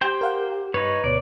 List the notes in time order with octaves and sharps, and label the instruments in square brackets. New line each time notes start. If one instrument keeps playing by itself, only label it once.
[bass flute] G4 [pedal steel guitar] C5 G5
[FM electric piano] A#4 F5 F#5
[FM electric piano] G2 [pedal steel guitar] D#4 C#5 [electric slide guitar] B4
[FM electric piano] D2 B2 [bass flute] C#5 [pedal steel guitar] D5